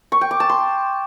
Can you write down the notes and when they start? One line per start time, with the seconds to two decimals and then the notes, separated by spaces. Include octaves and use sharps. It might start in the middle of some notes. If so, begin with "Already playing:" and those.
0.12 C#6
0.21 G5
0.31 D6
0.40 A5
0.50 C6